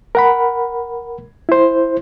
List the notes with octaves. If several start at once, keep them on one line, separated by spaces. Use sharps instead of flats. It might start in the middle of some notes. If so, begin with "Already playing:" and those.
A#4 F#5 B5
E4 C5